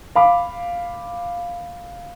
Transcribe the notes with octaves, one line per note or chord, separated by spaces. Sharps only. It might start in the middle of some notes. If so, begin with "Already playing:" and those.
F5 B5 D6